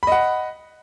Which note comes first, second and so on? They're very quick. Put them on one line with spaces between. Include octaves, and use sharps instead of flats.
B5 D#5 F#5